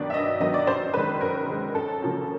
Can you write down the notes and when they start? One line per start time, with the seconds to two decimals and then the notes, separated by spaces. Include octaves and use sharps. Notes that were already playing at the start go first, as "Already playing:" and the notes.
Already playing: G2 D#3 F#3 B3 D4 D5
0.10 E5
0.14 G2 D#5
0.40 D#3 F#3 B3 D4 D#5
0.54 D5
0.67 F#2 C5
0.94 D#3 G#3 B4
1.21 F#2 A#4
1.47 D#3 G#3
1.75 F#2 A4
2.01 C#3 F3 A#3 C#4